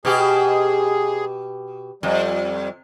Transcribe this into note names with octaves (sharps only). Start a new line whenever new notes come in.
B2 G4 G#4
F2 G3